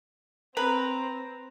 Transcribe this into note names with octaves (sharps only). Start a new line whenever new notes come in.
C4 B4 A#5